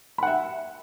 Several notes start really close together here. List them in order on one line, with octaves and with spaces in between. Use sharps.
B5 F#5 E5